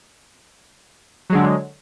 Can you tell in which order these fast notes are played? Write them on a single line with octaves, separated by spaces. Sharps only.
F#3 G#3 D3